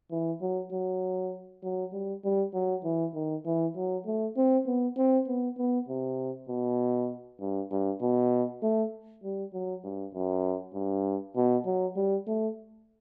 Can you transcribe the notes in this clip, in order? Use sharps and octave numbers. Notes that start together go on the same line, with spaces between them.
E3
F#3
F#3
F#3
G3
G3
F#3
E3
D#3
E3
F#3
A3
C4
B3
C4
B3
B3
C3
B2
G2
G2
B2
A3
G3
F#3
G2
F#2
G2
B2
F#3
G3
A3